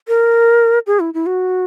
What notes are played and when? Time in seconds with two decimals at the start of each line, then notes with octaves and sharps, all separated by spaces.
0.08 A#4
0.87 G#4
1.00 E4
1.14 E4
1.26 F#4